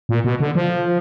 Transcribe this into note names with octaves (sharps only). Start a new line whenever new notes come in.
A#2
B2
D3
F3